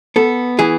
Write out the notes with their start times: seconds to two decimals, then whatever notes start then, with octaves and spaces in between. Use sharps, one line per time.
0.16 B3 A4
0.59 E3 G#4